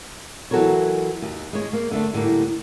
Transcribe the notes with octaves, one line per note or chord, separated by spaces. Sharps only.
E3 F#3 F#4 A4 A#4 C#5
D#2
G#3 C#5
A#3
D3 A3 D4
A2 D3 G3 A#3